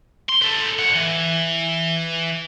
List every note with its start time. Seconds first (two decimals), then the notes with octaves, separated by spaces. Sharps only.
0.29 C6
0.42 A4 B4
0.79 A2 F#5
0.96 E3